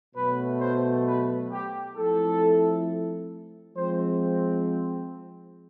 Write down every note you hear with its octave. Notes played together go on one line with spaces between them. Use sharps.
B2 F#3 A3 B4
C5
B4
G4
F3 A3 C4 E4 A4
F3 G#3 C4 C5